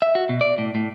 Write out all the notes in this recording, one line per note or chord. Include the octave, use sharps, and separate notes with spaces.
E5
F#4
B2
D5
A2
A2